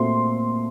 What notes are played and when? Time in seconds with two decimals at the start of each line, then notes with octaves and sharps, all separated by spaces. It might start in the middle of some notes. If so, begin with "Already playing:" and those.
Already playing: A#2 A3 C4 F#4 C6